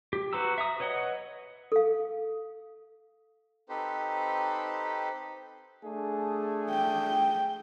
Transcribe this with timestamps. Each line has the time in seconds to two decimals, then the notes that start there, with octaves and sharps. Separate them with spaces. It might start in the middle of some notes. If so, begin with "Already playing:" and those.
0.13 G4
0.33 F#4 B4 C5 A#5 E6
0.58 E5 A#5 D#6
0.80 B4 C#5 D#5 F#5
1.72 A4 F5
3.69 C4 D#4 G4 A4 B4 C5
5.83 A3 D4 G#4
6.70 G5